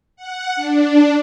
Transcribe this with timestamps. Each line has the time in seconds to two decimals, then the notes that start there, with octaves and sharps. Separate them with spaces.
0.16 F#5
0.56 D4